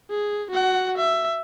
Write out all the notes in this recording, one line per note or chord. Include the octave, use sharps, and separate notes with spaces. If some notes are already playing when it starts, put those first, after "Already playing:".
G#4
F#4 F#5
E5